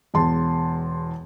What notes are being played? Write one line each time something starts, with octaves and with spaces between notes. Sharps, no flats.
E1 E2 A5 C6